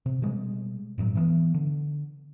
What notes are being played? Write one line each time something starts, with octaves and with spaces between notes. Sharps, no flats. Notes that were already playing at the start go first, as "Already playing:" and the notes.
C3
B2 G3 G#3
G1 A2 C#3 F#3
E3 F3 B3
D3